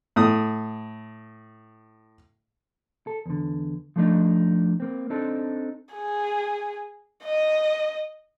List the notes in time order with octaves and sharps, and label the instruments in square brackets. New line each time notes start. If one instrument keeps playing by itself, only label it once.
[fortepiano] A2 D#6
[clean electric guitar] A4
E2 D3
F3 A3 D4 D#4
A#3 C4
C4 D4 D#4 A4
[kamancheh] G#4
D#5